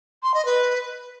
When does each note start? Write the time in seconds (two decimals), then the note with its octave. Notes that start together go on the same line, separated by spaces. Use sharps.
0.23 C6
0.34 D#5
0.45 B4